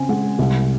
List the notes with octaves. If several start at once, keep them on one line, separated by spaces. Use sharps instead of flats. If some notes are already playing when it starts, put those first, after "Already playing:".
Already playing: C#3 C4 G#5
G#3 F#5
C2